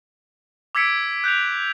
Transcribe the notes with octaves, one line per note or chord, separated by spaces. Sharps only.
D6 E6 G#6 B6 C#7 D7
F#6 G6 C#7 F7